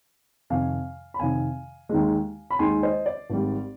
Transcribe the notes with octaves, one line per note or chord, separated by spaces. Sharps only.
F2 C3 D#3 F5 G#5
B5
F2 C3 D#3 F5 G#5
D#2 D#3 G#3
B5
D#2 D#3 G#3 G#5 C6
C5 D#5
D5
G#1 G#2 G3